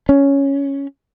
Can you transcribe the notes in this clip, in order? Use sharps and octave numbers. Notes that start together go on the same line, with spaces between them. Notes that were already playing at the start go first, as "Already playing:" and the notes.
C#4